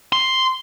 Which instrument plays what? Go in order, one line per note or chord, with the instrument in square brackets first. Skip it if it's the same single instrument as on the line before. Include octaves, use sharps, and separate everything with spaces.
[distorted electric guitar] C6